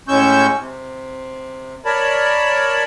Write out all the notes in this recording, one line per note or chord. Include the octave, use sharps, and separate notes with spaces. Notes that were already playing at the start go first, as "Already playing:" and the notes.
A2 G#3 C#4 C#6 E6 G6
C3
A#4 C#5 D5 A5 B5